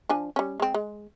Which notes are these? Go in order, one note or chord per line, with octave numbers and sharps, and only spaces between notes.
F3 D4 G#5
G3 C#4
G#3 C4
G#3